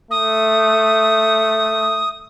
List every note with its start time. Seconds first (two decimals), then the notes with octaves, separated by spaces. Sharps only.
0.11 A3 D#6